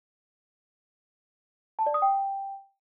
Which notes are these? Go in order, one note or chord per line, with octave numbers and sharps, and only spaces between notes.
A5
D5
D#6
G5